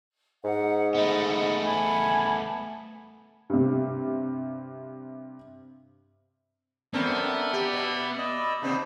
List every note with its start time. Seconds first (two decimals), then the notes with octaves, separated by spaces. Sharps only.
0.44 G#2 F#5
0.95 A3 B3 D#5 B5
1.64 G#5 A5 B5
3.50 G2 C3
6.94 F#2 B3 C4 D4 A4 A#4
7.53 G4 D5 E5
7.74 B2
8.18 D5 D#5 E6
8.62 C3 B3 C4 D4 D#4